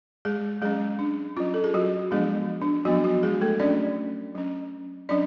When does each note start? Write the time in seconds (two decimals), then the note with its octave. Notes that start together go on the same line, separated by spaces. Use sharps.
0.25 G#3 G#4
0.62 F#3 G#3 C#4 G#4
0.99 D4
1.37 F#3 C#4 F4
1.54 A4
1.64 G#4
1.74 F#3 F#4
2.11 F3 G#3 B3 D4 G#4
2.61 D4
2.85 F3 F#3 B3 D4 F#4
3.04 F#3 F#4
3.23 G#3 G#4
3.41 A3 A4
3.60 F#3 C#4 D4 D5
4.35 F#3 C#4
5.09 F#3 C#4 D4 D5